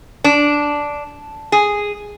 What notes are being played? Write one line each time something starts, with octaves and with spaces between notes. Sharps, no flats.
D4
G#4